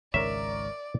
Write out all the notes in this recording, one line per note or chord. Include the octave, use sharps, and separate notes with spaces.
G#1 C#2 G#2 A#4 C#5 D5 E5